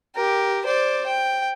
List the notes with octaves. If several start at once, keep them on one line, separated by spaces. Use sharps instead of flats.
G4 A#4
C5 D5
G5